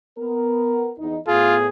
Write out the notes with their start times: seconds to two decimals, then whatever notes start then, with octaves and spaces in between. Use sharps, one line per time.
0.17 B3 A#4
0.98 E2 D#4
1.28 A2 B3 F4 G#4